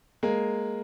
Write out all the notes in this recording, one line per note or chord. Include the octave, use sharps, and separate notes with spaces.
G#3 A#3